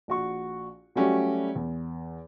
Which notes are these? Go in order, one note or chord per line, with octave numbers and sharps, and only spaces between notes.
A#1 F#4 C#6
F#3 G3 A3 C#4 F#4 G4
E2